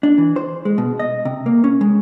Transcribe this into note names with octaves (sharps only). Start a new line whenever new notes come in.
D4
E3
C5
G#3
B2
D#5
C3
A#3
C#4
G#3